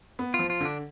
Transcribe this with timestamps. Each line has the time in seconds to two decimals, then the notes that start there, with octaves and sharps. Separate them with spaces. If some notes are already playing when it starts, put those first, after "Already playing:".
0.19 B3
0.34 F4
0.39 F3
0.50 F4
0.61 D3 D4